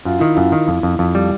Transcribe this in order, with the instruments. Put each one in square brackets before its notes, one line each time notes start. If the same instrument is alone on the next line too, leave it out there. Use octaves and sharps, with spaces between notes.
[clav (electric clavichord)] F#2 [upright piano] F4
[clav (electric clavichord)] D#3 [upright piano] E4
[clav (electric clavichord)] F#2 [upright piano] F4
[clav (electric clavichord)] D#3
F2
F2
F2
G3